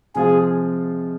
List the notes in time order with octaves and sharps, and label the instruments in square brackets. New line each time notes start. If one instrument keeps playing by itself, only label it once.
[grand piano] C3 F3 G#3 C4 F4 [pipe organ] G#4